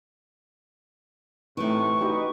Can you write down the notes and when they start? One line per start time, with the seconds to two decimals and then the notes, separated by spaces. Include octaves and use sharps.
1.57 A2 C3 E3 A3 D#4 C#6
2.01 D#4 F#4 G4 B4 D#5